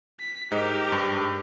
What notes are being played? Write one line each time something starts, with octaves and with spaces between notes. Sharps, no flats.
B6
G#2 D#4 G4 A#4
G2